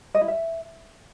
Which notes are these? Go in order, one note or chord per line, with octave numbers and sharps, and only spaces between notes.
D#5
E4
E5